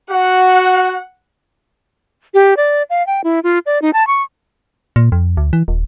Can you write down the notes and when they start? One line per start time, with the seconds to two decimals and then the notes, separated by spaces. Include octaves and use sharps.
0.11 F#4 F#5
2.34 G4
2.57 D5
2.90 F5
3.07 G5
3.24 E4
3.44 F4
3.66 D5
3.82 D#4
3.93 A5
4.07 C#6
4.96 A#2
5.12 F2
5.37 D2
5.53 E3
5.68 D#1